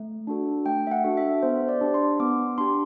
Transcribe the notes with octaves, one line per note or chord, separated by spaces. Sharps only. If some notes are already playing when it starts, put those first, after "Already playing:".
Already playing: A3
D4 F#4 A4
A3 G5
E5
F#5
D4 F#4 A4
E5
B3 C5
D5
D4 G4
C6
B3 D6
D4 G4 C6